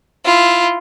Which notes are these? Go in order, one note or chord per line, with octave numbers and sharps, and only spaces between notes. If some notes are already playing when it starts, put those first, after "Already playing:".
E4 F4